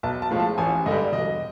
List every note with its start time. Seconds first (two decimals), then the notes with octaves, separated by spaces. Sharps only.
0.03 B1 A5
0.22 A5
0.31 A2 F3 G#3
0.40 A5
0.58 A1 G#5
0.86 G2 D3 G3 D#5
1.13 E1 D#5